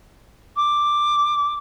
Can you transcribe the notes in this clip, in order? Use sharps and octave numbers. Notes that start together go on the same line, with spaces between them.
D6